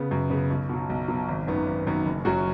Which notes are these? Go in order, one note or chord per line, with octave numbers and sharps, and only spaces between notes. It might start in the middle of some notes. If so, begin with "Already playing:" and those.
Already playing: C#3 B3
F#2
C#3 B3
B1
B2 F#3
B1
B2 F#3
G#1
F#2 D#3 B3
G#1
F#2 D#3 B3
F#1
F#2 F#3 C#4 F#4